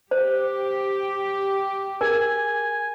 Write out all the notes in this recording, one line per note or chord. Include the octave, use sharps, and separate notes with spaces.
G4 C5
G#4 A#4 G#5